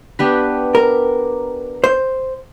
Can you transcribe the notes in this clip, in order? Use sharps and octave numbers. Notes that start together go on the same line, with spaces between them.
B3 D4 G4 B4
A#4
C5